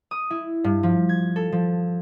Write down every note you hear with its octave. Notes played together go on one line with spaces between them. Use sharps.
D#6
E4
G2
F3
G#6
A4
F3